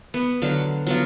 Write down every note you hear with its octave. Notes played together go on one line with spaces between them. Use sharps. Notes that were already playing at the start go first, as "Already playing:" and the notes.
B3
D3 F#3 F5
F#3 B3 F4